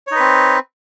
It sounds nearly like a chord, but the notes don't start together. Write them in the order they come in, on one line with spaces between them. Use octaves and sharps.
C#5 D#4 B4 C4